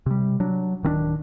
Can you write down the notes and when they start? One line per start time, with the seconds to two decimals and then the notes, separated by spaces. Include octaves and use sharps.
0.06 C3 G3
0.40 F#3 D4
0.83 D1 D#3 C4 D4